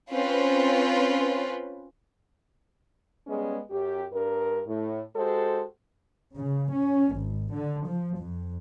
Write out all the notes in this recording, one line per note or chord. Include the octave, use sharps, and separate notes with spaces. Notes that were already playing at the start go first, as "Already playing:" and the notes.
C4 C#4 F4 B4
G3 G#3 B3 C#4 G#4
F#2 G4
G2 A#4
A2
G#3 F#4 G4 A4 C5
C#3
C#4
G#1
D3
F3
F2